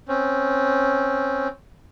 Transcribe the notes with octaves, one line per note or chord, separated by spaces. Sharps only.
C4 C#4